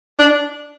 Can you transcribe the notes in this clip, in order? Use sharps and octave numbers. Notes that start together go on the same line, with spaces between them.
D4